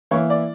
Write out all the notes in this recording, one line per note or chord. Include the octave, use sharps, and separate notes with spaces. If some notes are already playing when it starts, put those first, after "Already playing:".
E3 A#3 E4 C#5
D5